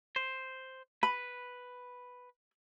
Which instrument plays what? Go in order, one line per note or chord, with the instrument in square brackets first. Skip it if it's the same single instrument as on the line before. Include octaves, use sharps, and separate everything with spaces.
[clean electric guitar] C5
[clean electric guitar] B4 [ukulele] B5